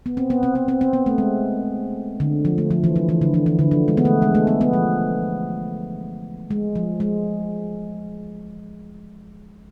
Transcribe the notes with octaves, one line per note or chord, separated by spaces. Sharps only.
B3
C4
B3
C4
B3
C4
C4
B3
A3
G#3
D3
F3
A3
F3
E3
F3
E3
D3
E3
E3
D3
F3
G#3
B3
A3
G#3
A3
B3
B3
F3
G#3
F3
G#3